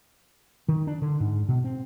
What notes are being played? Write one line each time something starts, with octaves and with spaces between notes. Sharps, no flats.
D#3
D4
D3
G#2
B2
C4